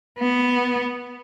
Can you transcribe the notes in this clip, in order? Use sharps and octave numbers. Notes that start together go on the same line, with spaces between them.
B3